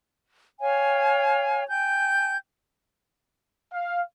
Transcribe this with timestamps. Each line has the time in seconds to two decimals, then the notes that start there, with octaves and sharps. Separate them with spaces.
0.59 C#5 F5 G5 G#5
1.68 G5 G#5 G6
3.72 F5